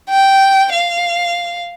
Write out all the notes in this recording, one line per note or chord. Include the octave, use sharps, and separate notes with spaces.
G5
F5